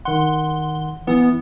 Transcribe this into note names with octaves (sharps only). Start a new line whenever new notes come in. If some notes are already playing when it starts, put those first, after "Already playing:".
D#3 F#5 C6
E3 B3